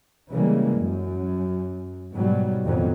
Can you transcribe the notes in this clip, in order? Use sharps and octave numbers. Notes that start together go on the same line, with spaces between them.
C#3 E3 G3 G#3 A#3
F#2
G#2 B2 F#3 G3
A1 F2 D#3 F#3 B3